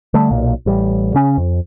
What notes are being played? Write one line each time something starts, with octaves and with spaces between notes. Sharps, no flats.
D3 G3 A3
B1 A#2
A1 G3
C#3 C#4
F2